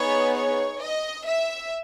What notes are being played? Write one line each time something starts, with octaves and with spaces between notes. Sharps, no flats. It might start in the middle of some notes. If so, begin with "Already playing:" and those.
Already playing: B3 D#4 G#4 C#5
C#5
D#5
E5